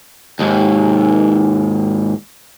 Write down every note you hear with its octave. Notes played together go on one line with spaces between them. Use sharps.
D#2 G#2